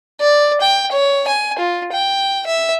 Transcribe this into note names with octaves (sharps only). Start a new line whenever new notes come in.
D5
G5
C#5
G#5
F4
G5
E5